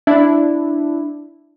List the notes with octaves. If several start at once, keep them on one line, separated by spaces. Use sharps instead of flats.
D4 E4